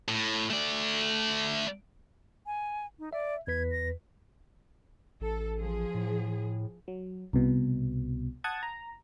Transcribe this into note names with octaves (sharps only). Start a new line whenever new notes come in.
A2
A3 D5
G#5
D#4
D5 E5
E2 B4 G#6 B6
A#6
A1 A4
F3 G#4
A2
F#3
C2 B2
F#5 A5 D#6 G#6
A#5